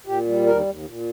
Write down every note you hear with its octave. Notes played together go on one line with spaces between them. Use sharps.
A#2 G4
G3
D#2 A#4
D#2
A#2